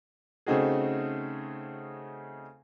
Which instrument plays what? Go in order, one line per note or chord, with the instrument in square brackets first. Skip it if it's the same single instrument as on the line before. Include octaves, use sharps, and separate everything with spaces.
[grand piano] C#3 A3 C4 D#4 F#4 G#4